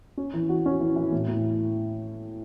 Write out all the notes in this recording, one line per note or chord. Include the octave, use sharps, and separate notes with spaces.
C#4
E3
F#4
C#4
E3
E3
A2
A2